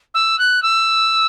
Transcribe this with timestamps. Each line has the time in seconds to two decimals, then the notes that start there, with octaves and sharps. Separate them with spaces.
0.14 E6
0.38 F#6
0.62 E6